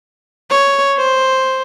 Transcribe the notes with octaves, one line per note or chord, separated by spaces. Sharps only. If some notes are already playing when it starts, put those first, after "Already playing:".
C#5
C5